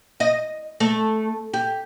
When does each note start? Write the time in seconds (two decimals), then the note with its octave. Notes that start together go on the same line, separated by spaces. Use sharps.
0.20 D#5
0.80 A3
1.54 G4